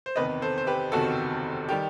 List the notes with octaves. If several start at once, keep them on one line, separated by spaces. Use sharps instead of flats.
C5
F#1 E2 C3 D#3 B4 D#5
A4 C5
C5
G4 B4
F#1 E2 C3 D#3 F#4 A4
D#3 G3 G4